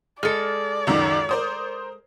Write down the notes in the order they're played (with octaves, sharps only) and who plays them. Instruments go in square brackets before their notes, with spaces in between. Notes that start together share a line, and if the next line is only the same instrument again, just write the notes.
[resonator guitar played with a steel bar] G#3 A4 [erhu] D5 [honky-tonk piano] F6 C#7
[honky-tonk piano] C#2 F#2 D#3
A#4 C5 D#6